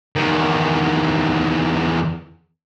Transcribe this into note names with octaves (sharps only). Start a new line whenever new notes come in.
E2 D#3